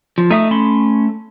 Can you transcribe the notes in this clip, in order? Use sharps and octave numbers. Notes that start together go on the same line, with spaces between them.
F3
A3 D#4 E5 D#6
C#4 B5 C6